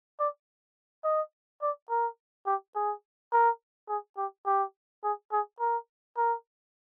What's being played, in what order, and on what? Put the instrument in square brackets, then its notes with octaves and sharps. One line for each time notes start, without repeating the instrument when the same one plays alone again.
[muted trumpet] D5
D#5
D5
A#4
G4
G#4
A#4
G#4
G4
G4
G#4
G#4
A#4
A#4